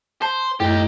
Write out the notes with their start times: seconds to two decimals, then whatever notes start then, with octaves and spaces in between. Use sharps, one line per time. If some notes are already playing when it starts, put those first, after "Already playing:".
0.22 C5 A5
0.60 F#2 A2 D#4 G4